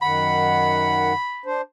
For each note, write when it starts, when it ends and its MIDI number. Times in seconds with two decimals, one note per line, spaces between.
0.02 1.13 42
0.02 1.13 51
0.02 1.13 78
0.02 1.48 83
1.46 1.61 62
1.46 1.61 72